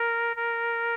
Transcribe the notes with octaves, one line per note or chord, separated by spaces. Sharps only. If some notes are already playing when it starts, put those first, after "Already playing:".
Already playing: A#4
A#4